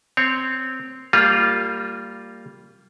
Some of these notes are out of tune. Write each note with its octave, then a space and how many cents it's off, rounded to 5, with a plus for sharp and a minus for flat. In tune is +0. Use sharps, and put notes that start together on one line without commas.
C4 -5 C#5 +0
G3 +0 A#3 -25 F4 +0